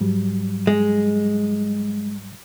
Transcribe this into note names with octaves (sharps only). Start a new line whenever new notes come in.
G#2 F#3 G3
G#3